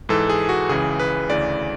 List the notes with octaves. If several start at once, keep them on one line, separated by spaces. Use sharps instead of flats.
G#2 E3 A4
G#4
F#4
C#2 C#3 E3 G#4
B4
D2 C#3 E3 D5